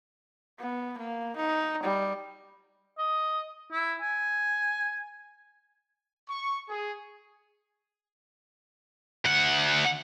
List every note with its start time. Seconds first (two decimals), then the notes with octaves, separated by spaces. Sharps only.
0.59 B3
0.98 A#3
1.36 D#4
1.83 G3
2.98 D#5
3.72 E4
4.01 G#5
6.29 C#6
6.69 G#4
9.25 D2 F#5